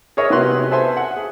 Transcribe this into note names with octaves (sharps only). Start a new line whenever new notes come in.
G#4 A#4 C#5 D#5 E5
C3 B3 E4 F#4 C6 F#6
A4 B4 C5 E5 G#5 C6
F#5
G#4